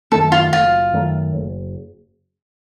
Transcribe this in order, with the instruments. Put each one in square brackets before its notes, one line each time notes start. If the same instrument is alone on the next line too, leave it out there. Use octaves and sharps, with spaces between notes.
[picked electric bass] F#2 D#3 A3 [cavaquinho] A4
[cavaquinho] F4
[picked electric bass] F#1 [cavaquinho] F4
[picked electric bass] F#2 D#3 A3
F#1